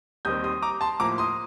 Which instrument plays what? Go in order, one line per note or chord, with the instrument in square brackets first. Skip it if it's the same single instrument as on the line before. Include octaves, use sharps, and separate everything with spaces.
[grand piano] D#2 D#3 G3 C4 D#6 G6
C6 D#6
A#5 D6
A5 C6
A2 F3 A#3 A#5 D6
C6 D#6